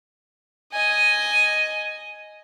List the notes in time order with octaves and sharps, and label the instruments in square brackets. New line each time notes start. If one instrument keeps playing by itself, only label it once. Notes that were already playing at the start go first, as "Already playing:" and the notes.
[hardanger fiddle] D#5 G#5